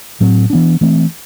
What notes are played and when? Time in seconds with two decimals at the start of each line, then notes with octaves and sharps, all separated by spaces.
0.20 A2 F#3 C4
0.50 E3 B3 D4
0.81 E3 A3 C4